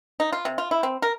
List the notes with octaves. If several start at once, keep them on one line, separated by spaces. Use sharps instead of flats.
D#4
F4
C3
F4
E4
C4
A#4